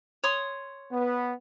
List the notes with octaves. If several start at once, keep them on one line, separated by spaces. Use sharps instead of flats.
C#5 C6 D#6
B3